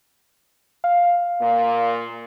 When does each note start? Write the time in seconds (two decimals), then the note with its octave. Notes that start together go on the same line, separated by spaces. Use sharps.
0.84 F5
1.41 A#2 A#3